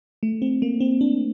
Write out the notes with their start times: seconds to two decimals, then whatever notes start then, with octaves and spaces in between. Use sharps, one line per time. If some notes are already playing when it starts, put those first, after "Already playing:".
0.23 A3
0.42 C4
0.62 A#3
0.81 C4
1.01 D4